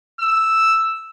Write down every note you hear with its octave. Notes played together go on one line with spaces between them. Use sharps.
E6